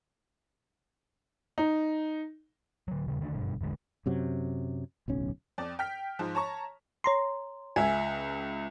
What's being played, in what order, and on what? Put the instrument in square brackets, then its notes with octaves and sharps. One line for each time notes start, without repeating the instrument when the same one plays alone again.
[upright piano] D#4
[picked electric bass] D3 F#3
D#1 C#3 G3
D3 D#3 A3 D4
F#1 G2 B2 D3
E1 A1 D3 G#3
[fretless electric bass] F#2 C3 F#3
D1 B1 C#4
[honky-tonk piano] F2 D5
G5 F6 B6
G#2 F3
C#5 A5 A#5 C#6
[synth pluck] C#5 A#5 C6
[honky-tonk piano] C#2 E5 [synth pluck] G#5